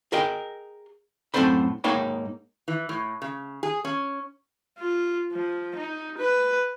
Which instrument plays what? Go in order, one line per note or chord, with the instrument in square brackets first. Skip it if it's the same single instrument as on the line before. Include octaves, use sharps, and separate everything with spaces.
[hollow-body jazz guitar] G#4 A#4 D#5 G5
F#2 A2 C4 A4 C5 B5
G#2 A#3 D#4 C#5 G5 B5
[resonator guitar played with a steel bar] E3
A2
C#3
G#4
C#4
[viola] F4
F3
D#4
B4